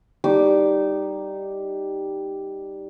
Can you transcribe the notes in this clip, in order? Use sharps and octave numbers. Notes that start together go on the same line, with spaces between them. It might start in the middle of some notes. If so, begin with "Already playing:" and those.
G3 D#4 D6